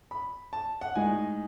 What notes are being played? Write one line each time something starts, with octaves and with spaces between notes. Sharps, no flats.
B5
A5
F#5
A2 G#3 D#4 G#5